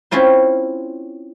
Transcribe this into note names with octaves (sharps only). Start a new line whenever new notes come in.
C4 C#4 E4 F4 C5